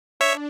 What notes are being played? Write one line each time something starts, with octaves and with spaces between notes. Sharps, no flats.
D4 C#5 E5